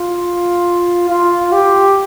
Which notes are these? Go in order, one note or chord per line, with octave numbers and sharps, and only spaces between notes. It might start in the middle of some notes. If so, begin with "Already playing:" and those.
Already playing: F4
F4
G4